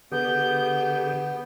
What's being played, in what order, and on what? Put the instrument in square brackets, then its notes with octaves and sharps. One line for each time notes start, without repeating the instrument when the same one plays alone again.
[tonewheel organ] D3 G4 G#4 [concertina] B3 [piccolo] G6